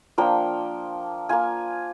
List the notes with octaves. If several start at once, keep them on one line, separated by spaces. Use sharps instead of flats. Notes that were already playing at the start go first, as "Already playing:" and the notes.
F3 A#3 D4 F4 G5
A#3 F4 G#5